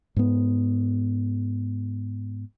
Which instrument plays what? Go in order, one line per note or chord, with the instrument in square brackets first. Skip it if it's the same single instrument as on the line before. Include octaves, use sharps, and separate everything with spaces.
[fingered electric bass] G#2 B3